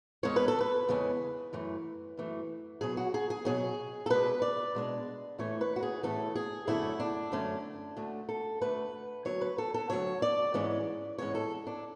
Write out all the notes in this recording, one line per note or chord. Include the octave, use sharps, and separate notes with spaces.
E2 C#3 G#3 C#4 C#5
B4
A4
B4
E2 C#3 G#3 C#4
F#2 E3 A3
F#2 E3 A3
B2 F#3 C#4 G#4
F#4
G#4
G#4
B2 F#3 C#4 G#4
A4
B2 G#3 D4 B4
D5
B2 G#3 D4
A2 E3 A3 C#4 C#5
B4
F#4
G#4
A2 E3 A3 C#4 A4
G#4
F#2 D3 A3 C#4 E4
D4
F#2 D3 A3 C#4
D2 D3 A3
A4
D2 D3 A3 B4
D2 C#3 F#3 C#5
B4
A4
A4
D2 C#3 F#3 C#5
D5
G#2 E3 G#3 C#4
G#2 E3 G#3 C#4 C#5
A4
D4